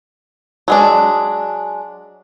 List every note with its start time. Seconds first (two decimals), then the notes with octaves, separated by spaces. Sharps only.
0.68 F#3 G#3 D4